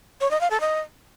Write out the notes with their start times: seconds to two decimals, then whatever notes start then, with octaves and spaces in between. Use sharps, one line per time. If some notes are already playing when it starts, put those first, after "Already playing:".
0.21 C#5
0.31 D#5
0.41 F5
0.51 A4
0.60 D#5